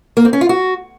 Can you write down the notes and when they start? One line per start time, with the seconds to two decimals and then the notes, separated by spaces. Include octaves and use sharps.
0.17 A#3
0.25 C4
0.33 C#4
0.41 F4
0.49 F#4